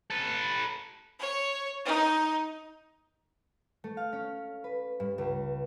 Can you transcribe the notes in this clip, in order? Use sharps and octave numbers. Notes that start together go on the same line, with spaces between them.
A4 B4
C#5
D#4
A3
F5
C#4
B4
G2
C#2